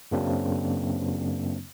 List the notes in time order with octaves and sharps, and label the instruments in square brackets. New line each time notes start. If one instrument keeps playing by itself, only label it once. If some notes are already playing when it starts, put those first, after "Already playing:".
[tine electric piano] F#2 C#3 F#3 A#3 C4 D4